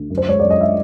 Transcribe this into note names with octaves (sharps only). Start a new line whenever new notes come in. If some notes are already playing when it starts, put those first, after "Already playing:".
Already playing: D2
F#2
C5
G#3 C#5
F#2 D5
D#5
G#3 E5